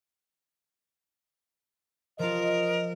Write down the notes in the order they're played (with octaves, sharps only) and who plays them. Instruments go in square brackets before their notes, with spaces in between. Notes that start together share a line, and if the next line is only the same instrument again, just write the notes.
[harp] F3 F4 [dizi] A#4 [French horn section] D#5